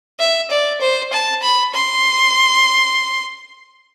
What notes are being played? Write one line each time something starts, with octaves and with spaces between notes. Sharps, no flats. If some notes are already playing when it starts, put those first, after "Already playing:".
E5
D5
C5
A5
B5
C6